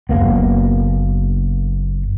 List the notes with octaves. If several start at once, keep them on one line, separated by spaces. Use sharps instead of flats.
F#1 E2 A#3 B3